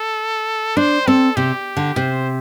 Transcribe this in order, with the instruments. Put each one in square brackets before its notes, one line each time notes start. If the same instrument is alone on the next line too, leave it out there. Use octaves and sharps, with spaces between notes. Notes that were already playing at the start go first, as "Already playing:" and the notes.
Already playing: [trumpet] A4
[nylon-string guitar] D4 [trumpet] C5
[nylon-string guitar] C4 [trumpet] A4
[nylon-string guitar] C3 [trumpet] G4
[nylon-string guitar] D3
[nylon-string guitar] C3 [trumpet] C5